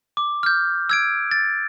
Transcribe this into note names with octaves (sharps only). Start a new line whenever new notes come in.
D6
F6 G6
E6 G#6 D7
A6